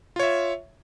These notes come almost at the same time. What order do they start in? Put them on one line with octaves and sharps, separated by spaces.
F4 C#5 E5